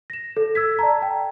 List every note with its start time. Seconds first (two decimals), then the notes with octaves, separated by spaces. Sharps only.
0.10 A#6 E7
0.37 A4
0.55 E6 G#6 B6
0.79 D5 A5 A#5
1.02 G5